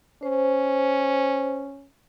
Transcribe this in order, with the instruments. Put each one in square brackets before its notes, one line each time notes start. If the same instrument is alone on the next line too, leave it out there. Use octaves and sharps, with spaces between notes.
[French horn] C#4 [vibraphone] C5